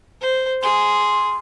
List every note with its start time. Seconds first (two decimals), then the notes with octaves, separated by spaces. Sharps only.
0.21 C5
0.63 G#4 C6